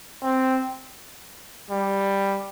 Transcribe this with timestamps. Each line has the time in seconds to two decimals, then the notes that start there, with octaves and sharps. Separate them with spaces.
0.23 C4
1.71 G3